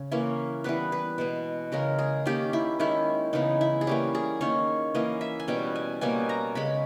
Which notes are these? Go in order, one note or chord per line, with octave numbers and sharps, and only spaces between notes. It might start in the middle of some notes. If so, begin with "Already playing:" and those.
Already playing: C#3
E3 A#3 C#4
E3 G3 B3 B4
B4
B2 G#3 B3
C#3 G#3 C#4 A#4
G#4
D#3 A#3 C#4 G4
E4
D#3 G#3 C#4 E4
C#3 E3 G#3 B3 D#4
E4
G#4
E3 G3 A#3 C#4 G4
G#4
D#3 A#3 C#4 C#5
E3 A#3 C#4 D#5
E5
G#5
B2 G3 C#4 G5
G#5
B2 G3 A#3 C#4 G#5
A#5
C#3 G#3 C#4 B5